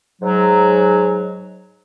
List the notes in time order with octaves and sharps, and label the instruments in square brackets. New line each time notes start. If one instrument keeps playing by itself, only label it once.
[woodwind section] G#2 F#3